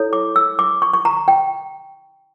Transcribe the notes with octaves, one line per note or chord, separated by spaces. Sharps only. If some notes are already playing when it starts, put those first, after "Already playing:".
Already playing: E4 A4 C#5
D6
E6
D6
C#6
C#6
A#5
G5